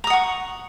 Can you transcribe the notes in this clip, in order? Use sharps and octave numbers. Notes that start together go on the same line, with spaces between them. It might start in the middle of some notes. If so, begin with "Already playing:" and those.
F#5 A#5 C#6 D#6